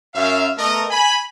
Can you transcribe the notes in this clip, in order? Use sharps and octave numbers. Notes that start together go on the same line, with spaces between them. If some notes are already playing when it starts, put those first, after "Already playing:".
F#2 E5 F5
A3 B3 A4 A#4 D#5 A#5
G#5 B5